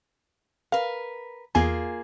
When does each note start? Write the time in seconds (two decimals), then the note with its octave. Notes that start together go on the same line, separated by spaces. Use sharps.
0.72 A#4 B4 F5
1.55 E2 A#3 F4 G#4 G#5